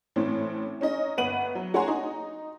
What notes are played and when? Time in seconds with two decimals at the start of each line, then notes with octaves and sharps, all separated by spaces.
0.16 A2 E3 A3 C4 C#4
0.81 C#4 D#4 D#5
1.17 G1 B4 F#5 D#7 F#7
1.55 F#3
1.74 F#4 C#5 F#5 G#5 A#5 C6
1.88 D#4